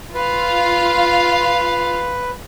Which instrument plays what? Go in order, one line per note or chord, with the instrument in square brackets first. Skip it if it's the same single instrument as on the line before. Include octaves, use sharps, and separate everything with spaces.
[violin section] F4 F5 [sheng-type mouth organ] B4